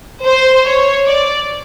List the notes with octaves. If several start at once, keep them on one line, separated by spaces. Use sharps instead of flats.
C5
C#5
D5